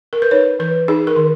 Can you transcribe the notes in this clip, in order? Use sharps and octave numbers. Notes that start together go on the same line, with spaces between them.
A#4
B4
D#4 C#5
E3 B4
D#4 G#4
A#4
D#3